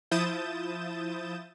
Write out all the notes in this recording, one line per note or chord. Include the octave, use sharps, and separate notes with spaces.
F3 E4 D#6 G6 A6 E7